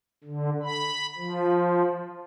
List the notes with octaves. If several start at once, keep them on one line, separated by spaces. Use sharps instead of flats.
D3
B5
F3